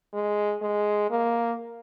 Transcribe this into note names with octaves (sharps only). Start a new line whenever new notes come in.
G#3
G#3
A#3